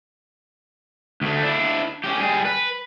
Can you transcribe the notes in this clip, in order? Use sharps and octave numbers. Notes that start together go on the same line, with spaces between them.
D2 A3
D4 E4
C#4 G4
G3 G#4
B4